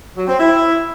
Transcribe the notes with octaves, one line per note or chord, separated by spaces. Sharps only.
F#3
C4
E4